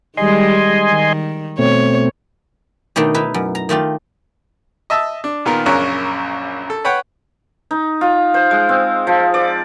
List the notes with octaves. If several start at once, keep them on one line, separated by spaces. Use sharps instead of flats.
D#3 G3 G#3 D#5 G#5 C6
D#3
B2 A3 C4 C#5
B2 D#3 A3 D4 D#4
D#4 E4 B4
F#2
A#5
D#3 A3 F4 G4
D#5 E5 A5 E6
D4
A#2 D#3 B3 F4 A#4
A#1 F#2 C#3 A#4 C#5 F#6
A4
B4 C#5 F#5 G5
D#4
F4
C5
G#3
C4
F3
D5